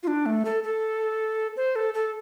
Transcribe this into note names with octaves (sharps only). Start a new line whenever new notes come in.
F4
D4
A3
A4
A4
C5
A4
A4